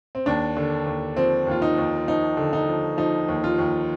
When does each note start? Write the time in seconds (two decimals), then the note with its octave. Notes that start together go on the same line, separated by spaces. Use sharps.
0.15 C4
0.26 D#2 D4
0.57 D3
0.86 D#2
1.17 F3 C4
1.47 D#2 F4
1.62 D#4
1.78 D#2
2.07 F3 D#4
2.37 D3
2.53 D#4
2.68 F3
2.97 F3 D#4
3.28 D#2
3.44 F4
3.59 D#2